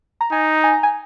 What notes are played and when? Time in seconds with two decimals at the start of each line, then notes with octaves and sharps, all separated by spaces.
0.21 A#5
0.32 D#4 G#5
0.64 G#5
0.73 A#5
0.83 G#5